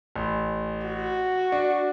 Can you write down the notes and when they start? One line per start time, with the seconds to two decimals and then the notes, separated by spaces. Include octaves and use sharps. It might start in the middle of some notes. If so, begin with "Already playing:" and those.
0.16 A1
0.86 F#4
1.52 D4